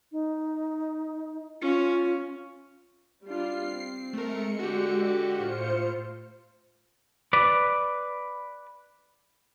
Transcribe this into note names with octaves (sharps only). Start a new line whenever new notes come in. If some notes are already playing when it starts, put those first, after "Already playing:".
D#4
C#4 F4
G3 D4 F4 C7
C4
G#3 A3 A#4 C#7
D3 F#4 G4
A2 F4 C5 C#7
B4 D5